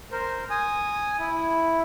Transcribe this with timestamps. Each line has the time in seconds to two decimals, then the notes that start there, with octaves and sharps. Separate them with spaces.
0.12 A#4 C5
0.50 G#5 D#6
1.19 E4